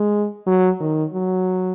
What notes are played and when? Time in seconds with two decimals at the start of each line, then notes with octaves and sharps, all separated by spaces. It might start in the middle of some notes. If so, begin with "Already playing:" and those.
Already playing: G#3
0.47 F#3
0.81 D#3
1.13 F#3